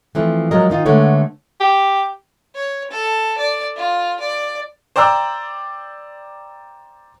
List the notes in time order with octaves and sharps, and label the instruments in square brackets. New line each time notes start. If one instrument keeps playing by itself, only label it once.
[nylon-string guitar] E3 F3 A3 C4
F3 F#3 G#3 A#4 D#5
D#3 D#4 F4
D3 G#3 A3 B3 C#5
[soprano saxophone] G4
[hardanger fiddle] C#5
A4
D5
F4
D5
[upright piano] C5 D5 G5 A#5 E6